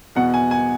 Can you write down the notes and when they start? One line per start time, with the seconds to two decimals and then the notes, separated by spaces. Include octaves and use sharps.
0.15 E2 B2 F#5
0.34 G#5
0.51 G#5